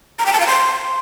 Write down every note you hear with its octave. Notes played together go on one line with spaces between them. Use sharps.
A#5
G5
A5
F5
C6